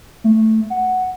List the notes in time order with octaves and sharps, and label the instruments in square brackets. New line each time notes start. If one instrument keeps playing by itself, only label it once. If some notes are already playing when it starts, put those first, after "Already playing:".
[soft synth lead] A3
F#5